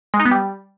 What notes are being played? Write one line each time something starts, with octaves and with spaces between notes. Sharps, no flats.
G#3
D#4
B3
G3